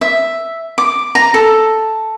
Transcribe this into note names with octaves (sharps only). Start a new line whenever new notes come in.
E5
D6
A#5
A4